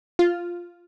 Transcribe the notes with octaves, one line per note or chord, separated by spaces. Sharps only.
F4